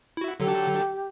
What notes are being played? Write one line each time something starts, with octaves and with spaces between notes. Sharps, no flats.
E4 F#4
D3 F#3 G4 A4